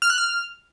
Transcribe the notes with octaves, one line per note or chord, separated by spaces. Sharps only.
F6
F#6
F6